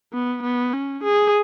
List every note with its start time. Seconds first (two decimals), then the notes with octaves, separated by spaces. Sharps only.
0.13 B3
0.43 B3
0.73 C#4
1.04 G#4